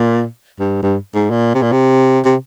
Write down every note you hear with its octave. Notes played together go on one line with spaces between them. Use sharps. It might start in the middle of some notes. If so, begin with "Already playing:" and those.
Already playing: A#2
G2
G2
G#2
A#2
C3
A#2
C3
C3